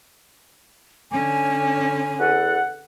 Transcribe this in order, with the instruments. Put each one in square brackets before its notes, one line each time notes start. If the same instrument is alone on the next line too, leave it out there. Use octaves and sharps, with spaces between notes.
[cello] D3 C#4 [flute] G#5
[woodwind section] E2 A4 F#5